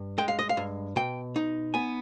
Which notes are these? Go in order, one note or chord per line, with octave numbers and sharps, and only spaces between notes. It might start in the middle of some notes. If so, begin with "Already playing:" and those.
Already playing: G2
G#3 G5
F5
D#5
F5
G2
B2 G5
D#4
B3 G#5